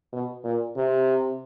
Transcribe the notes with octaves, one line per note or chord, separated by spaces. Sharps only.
B2
A#2
C3